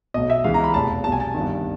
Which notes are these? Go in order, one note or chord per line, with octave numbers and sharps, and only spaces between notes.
B1 B2 D#5
E5
C#2 C#3 E3 F5
A#5
B5
F1 E2 B2 A5
C2 B2 A5
G#5
A5
G1 G2 D#3